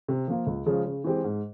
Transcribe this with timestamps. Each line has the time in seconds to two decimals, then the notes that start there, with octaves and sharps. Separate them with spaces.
0.08 C3
0.28 F3 A#3 F4
0.47 C#2
0.66 C#3 F3 G#3
0.86 C#3
1.04 E3 G#3 C4 G4
1.24 G#2